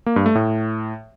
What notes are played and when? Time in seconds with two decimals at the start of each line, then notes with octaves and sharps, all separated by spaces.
0.06 A#3
0.16 G2
0.26 A3
0.35 A2